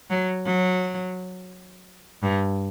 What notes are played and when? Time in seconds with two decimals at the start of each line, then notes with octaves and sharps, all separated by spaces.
0.10 F#3
0.46 F#3
2.23 G2